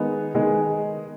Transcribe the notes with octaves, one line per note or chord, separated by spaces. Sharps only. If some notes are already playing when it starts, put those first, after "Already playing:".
Already playing: D#3 G#3 B3 D#4 G#4
D#3 G#3 B3 D#4 G#4